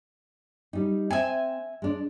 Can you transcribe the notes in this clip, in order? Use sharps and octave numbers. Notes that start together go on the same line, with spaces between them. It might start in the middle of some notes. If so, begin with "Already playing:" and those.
G3 D#4
C4 E5 G#5
G#3 D4